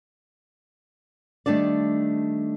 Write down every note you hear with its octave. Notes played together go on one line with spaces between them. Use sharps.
D#3 G3 A3 D4 D5